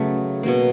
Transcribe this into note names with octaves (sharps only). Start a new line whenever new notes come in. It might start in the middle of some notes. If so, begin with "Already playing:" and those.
Already playing: C#3 F#3 A3 B3 C#4
B2 F#3 A#3